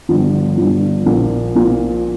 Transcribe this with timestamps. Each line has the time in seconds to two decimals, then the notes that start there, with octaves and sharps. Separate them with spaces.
0.09 G1 G2 F3
0.57 G1 G2 F3
1.06 A#1 A#2 F3 A#3
1.55 A#1 A#2 F3 A#3